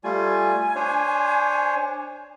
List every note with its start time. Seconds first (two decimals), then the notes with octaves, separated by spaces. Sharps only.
0.04 G3 A3 F4 G#5
0.75 D4 C5 C#5